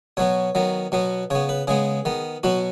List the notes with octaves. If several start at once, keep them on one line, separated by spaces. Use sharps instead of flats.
B2 F#3 B3 C#5
D#3 F#3 B3
B2 F#3 B3
C#3 B3 C#5
B4
C#3 G#3 B3 G#4
D#3 B3
B2 F#3 B3 F#4